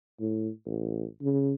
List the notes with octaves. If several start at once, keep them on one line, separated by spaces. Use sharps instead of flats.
A2
A1
C#3